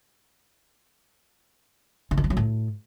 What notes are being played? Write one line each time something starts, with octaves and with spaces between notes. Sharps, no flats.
D3
D#3
F3
F#3
A2